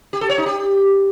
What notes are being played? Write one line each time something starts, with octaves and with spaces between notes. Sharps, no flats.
G4
A4
C#5
D#4
G4